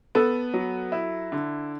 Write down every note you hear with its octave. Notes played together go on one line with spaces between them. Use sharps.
B3 A4
F#3
E4
D3